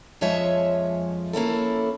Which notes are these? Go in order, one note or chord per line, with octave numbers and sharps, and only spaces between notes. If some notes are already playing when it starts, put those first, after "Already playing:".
F2 F3 G#3 C#5 E5 G#5
A#3 C#4 E4 A4